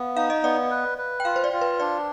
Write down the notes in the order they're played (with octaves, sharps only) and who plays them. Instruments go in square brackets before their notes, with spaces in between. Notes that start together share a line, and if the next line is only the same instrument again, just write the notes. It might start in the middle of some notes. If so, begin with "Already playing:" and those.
Already playing: [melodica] B3 [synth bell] F5
[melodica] D#4 [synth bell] F5
[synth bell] D#5
[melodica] B3 [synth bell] D5
[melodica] B4
B4
[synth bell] G5
[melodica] F4 [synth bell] F5
[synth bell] C5
D5
[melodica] F4
[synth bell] B4
[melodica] D4 [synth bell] D5